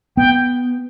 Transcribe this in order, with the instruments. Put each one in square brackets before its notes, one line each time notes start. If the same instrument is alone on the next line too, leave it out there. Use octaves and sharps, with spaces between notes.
[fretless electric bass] B3 [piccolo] G5